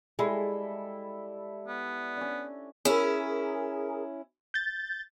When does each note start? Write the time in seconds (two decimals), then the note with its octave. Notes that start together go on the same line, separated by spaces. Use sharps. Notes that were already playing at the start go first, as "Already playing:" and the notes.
0.19 G3 G#3 E4 A4
1.68 B3
2.17 C#4 D4
2.85 C#4 E4 G#4 A#4
4.54 G6 A6